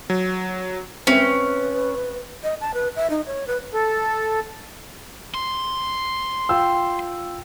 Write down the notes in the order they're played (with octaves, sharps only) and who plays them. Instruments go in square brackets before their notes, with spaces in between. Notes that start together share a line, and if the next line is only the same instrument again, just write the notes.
[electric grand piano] F#3
[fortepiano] C4 E5 [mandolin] C#4 [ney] B4
[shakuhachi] D#5
A5
B4
E5
D#4
C#5
B4
[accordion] A4
[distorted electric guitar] C6
[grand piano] F4 G5 E6